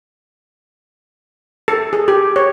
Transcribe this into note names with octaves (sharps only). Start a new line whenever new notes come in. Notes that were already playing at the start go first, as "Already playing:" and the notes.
A4
G#4
G4
C#5